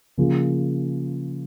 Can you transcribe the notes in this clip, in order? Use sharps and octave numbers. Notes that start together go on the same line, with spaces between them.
C#3 F3 A#3 F4 G#4